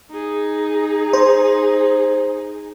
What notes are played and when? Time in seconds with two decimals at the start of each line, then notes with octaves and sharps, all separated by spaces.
0.11 D#4 G#4
1.13 C5